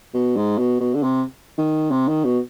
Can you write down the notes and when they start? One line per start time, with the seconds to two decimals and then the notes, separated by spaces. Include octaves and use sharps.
0.14 B2
0.37 G#2
0.59 B2
0.80 B2
0.95 D3
1.03 C3
1.58 D#3
1.91 C3
2.08 D#3
2.24 B2